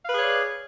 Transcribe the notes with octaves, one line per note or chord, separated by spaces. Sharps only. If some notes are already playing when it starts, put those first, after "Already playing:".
G#4 B4 C#5 D5 F5